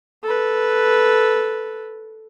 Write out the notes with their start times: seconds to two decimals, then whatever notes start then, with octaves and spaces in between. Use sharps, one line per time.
0.23 A4 B4